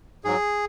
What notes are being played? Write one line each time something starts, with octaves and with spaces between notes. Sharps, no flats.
G#2 F#3 G#4